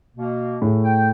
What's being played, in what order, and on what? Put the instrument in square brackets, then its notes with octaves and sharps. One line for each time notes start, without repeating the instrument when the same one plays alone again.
[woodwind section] B2 A#3
[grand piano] A2 A3 G#4
[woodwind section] G5